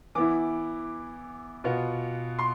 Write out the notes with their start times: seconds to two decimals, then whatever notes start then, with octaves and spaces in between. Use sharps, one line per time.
0.15 E3 B3 E4 D6
1.64 B2 B3 F4
2.39 C6